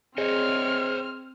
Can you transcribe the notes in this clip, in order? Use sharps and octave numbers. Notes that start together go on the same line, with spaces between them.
C4 G#4 C5 C#5 D#5 F6